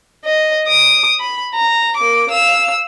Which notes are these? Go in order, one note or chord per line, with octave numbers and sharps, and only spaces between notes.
D#5
D#6 D7
B5
A#5
A#3 D6
F5 E6